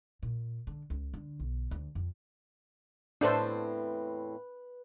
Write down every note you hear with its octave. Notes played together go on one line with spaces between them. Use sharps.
A#2
D3
C#2
D3
B1
D2
F2
E2 A2 C4 D4 A4 B4 C5